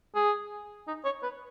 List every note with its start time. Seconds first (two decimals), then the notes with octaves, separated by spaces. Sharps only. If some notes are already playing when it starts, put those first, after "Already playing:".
0.15 G#4
0.87 D#4
1.05 C#5
1.23 B4